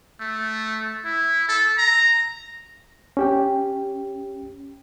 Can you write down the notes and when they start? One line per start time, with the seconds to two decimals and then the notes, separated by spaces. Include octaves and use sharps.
0.20 A3
1.04 E4
1.48 A4
1.77 A#5
3.17 C#4 G4 G5